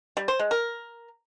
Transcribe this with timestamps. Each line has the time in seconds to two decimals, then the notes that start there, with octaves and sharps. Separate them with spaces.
0.17 G3
0.28 C5
0.39 G#3
0.51 A#4